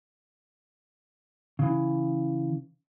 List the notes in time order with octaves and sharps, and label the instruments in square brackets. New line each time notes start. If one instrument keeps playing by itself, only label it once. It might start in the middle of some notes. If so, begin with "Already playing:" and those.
[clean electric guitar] C#3 E3